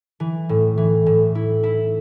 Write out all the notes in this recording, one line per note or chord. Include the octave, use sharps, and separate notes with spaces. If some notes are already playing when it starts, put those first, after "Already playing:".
E3
A2
E3
A2
E4
E4